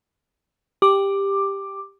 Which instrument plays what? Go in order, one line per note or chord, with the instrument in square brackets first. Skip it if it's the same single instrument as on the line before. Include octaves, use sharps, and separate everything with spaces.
[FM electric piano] G4 D6